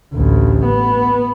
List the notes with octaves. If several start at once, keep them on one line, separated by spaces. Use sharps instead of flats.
A1 D2
B3